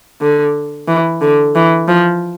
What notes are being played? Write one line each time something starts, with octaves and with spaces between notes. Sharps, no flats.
D3
E3
D3
E3
F3